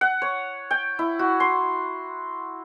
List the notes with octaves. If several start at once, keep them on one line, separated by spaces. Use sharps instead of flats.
F#5
C#5
G5
E4
F#4
C6